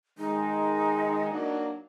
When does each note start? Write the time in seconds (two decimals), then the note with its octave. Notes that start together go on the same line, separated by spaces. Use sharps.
0.18 D#3 G#3 D#4
1.30 F#3 A#3 D4